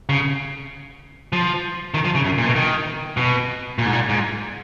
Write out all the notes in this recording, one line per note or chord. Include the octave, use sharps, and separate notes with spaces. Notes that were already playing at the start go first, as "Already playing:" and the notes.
C#3
F3
D#3
F3
C#3
F#2
A#2
B2
D#3
B2
A#2
G#2
A#2
G#2